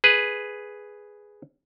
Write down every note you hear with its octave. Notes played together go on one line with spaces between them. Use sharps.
G#4 B4